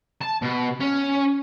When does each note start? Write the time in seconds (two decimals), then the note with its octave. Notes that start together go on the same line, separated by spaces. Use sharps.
0.21 A5
0.42 B2
0.80 C#4